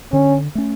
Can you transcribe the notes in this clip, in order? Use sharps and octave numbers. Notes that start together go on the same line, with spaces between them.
D3 C#4
A3 C#4